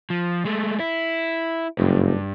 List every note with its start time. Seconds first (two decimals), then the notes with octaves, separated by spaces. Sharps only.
0.10 F3
0.45 G#3 A3
0.80 E4
1.78 F#1 G2